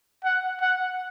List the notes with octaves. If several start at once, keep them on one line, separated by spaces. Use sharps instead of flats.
F#5
F#5